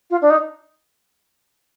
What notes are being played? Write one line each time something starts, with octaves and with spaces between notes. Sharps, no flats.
F4
D4
D#4